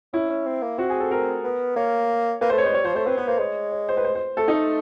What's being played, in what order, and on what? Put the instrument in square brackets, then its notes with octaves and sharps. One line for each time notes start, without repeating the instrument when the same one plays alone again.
[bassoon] C#4 [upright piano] E4
[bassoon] C#4
C4
A#3
[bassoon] C4 [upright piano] F#4
[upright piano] G#4
A4
A#4
[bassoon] B3
[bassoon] A#3 [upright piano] C#5
[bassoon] A#3 [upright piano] B4
[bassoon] A3 [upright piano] C5
[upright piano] C#5
[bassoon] G#3 [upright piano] C5
[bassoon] G3 [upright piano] C#5
[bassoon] F3 [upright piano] C5
[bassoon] A3 [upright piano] C5
[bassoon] C4 [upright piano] B4
[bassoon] B3 [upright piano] B4
[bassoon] A#3 [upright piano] C5
[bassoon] G#3 [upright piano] C#5
[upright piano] C#5
C5
B4
C5
C5
[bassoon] A3 [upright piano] A4
[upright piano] D#4
[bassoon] A3